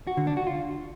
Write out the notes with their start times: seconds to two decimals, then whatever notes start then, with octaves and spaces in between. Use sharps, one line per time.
0.07 F#4
0.17 D3
0.27 D4
0.37 F#4
0.47 F4